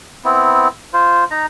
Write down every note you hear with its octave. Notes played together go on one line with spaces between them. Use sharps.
B3 C4 E4
F4 C5
D#4 A#5